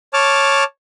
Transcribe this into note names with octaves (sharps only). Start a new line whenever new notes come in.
C#5 A5 D6 F6